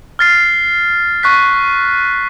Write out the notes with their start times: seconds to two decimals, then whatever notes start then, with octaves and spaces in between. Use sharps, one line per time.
0.19 F6 A6 C7
1.23 C#6 F#6 B6